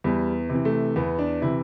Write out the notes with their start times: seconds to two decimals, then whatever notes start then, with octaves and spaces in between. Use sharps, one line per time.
0.04 E2 G3
0.49 C3
0.54 E3
0.65 A3
0.96 E2 B3
1.19 D4
1.42 C3 E3 E4